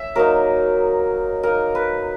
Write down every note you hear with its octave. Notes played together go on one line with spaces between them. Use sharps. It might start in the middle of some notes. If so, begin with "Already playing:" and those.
Already playing: C#4 E5
F#3 A#3 D#4 A#4
A#3 D#4 A#4
B4